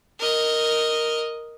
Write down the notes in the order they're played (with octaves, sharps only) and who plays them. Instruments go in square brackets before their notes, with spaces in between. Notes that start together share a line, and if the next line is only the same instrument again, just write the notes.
[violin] A#4 D#5